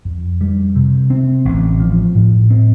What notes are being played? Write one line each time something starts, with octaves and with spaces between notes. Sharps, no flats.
F2
G3
C3
C4
A1
F3
A2
C4